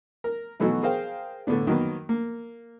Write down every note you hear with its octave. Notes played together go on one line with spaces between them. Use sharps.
A#4
B2 E3 F#3 A3 D#4 F#4
G#4 A#4 C5 F5 G5
A2 D3 A3 B3 D4
D#3 F#3 A#3 B3
A#3